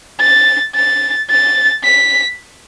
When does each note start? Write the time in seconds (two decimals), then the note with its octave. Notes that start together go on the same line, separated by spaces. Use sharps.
0.20 A6
0.76 A6
1.30 A6
1.84 B6